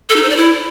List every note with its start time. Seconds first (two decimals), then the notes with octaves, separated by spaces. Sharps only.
0.09 A4
0.16 D#4
0.23 C5
0.30 D5
0.37 E4